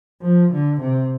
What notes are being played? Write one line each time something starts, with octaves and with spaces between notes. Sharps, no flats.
F3
D3
C3